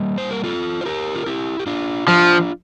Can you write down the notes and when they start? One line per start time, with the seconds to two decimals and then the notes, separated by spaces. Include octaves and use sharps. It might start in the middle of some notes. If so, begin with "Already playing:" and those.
Already playing: G3 A#3
0.18 C5
0.31 A#4
0.44 F4 A4
0.81 C5
0.85 G4 A#4
1.16 F4
1.26 E4 G4
1.59 G4
1.67 D4 F4
2.07 F3 D4 F4